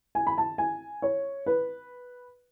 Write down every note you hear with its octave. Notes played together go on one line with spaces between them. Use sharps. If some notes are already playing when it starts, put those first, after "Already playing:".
G#5
B5
A5
G#5
C#5
B4